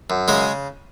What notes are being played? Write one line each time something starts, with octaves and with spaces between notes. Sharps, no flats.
F#2
C#3 G#3 G#4